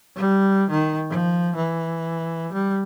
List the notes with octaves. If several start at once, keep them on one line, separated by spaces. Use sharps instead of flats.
G3
D#3
F3
E3
G3